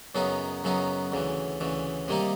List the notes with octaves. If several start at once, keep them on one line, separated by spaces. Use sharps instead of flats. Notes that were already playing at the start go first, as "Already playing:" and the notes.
F#2 C#3 F#3 B3 D#4
F#2 C#3 F#3 B3 D#4
D2 C#3 E3
D2 C#3 E3
C3 D#3 G3 A#3 D#4